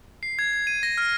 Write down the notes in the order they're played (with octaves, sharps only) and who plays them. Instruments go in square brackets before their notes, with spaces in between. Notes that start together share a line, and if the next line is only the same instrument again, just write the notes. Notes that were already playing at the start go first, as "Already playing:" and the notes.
[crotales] C7
G#6
G#6
D#7
A#6
F6